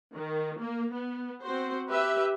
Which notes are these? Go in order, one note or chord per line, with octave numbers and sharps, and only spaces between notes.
D#3
A#3
B3
C4 F#4 C5
G4 B4 E5